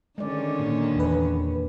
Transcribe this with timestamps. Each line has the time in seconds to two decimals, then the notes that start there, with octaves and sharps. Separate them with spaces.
0.18 D3 D#3 G#3 C#4 D5
0.59 A#2
0.96 E2 B4